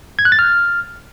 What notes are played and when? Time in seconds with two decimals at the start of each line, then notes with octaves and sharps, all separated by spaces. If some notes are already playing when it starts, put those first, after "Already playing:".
0.19 G#6
0.25 F#6
0.32 A6
0.39 F6